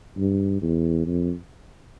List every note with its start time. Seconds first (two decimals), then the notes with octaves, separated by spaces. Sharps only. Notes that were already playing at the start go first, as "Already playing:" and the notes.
0.18 G2
0.62 E2
1.06 F2